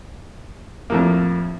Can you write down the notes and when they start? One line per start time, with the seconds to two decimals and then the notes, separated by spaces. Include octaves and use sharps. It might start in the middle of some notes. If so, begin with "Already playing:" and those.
0.90 F2 A2 A#3